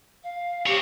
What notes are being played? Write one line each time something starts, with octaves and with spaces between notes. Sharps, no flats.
F5
C4 G4 C#5